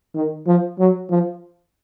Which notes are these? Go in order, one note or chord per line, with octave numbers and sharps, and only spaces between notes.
D#3
F3
F#3
F3